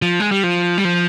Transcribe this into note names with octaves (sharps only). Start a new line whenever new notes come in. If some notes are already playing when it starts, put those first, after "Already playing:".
F3
G#3
G3
F3
G3
F3